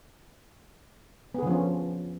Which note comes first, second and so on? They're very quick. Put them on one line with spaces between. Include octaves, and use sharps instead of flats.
B3 G#4 D3 F3 C#4